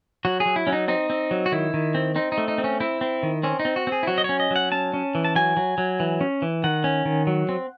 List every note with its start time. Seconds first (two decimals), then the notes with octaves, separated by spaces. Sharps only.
0.25 F#3 F#4
0.40 G#4
0.46 F#3
0.56 E4
0.67 F#3 C#4
0.73 D#4
0.88 C4 D#4
1.10 C4
1.31 F#3
1.46 F#4
1.52 D#3 E4
1.74 D#3
1.95 C4
2.16 C4 D#4
2.32 D#4
2.38 A3
2.48 D#4
2.58 C4
2.64 C#4
2.80 C4 E4
3.01 C4
3.23 D#3
3.43 C4 C#4
3.60 D#4
3.65 C4
3.76 F#4
3.87 C4
3.92 G#4
4.03 E4
4.07 F#3 F#4
4.18 D#5
4.24 C#4 C#5
4.40 D#5
4.51 F#3 F#5
4.72 C#4 A5
4.94 C#4
5.15 E3
5.25 A5
5.36 F#3 G#5
5.57 F#3
5.78 F#3
6.00 E3
6.21 C#4
6.42 E3
6.64 D#3 F#5
6.84 C#4
7.05 D#3
7.27 F#3
7.49 C4